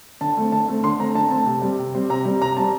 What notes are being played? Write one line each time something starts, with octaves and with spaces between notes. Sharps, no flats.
D3 A5
A3 C4
D3 A5
A3 C4
D3 C6
A3 C4 A#5
D3 A5
A3 C4 A5
C3
G3 C4
C3
G3 C4
C3 A#5
G3 C4
C3 A#5
G3 C4 A5